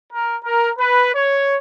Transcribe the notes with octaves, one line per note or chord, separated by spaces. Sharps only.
A#4
A#4
B4
C#5